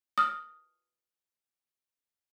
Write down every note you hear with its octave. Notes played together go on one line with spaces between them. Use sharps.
D#6 F6